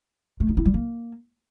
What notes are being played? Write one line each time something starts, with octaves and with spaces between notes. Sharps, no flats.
A3
D#4
E4
G3
A#3